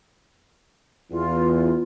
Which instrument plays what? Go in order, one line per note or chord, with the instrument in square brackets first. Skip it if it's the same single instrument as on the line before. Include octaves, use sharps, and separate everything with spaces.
[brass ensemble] E2 [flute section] F4